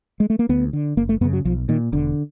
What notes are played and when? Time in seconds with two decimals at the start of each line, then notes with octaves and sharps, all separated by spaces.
0.20 G#3
0.30 A3
0.39 A#3
0.49 D2 B3
0.73 D3
0.97 F#1 A#3
1.09 A3
1.21 F#2 B3
1.24 C#3
1.33 F#3
1.45 B1 F3
1.69 A#2 D#3
1.92 E1 D3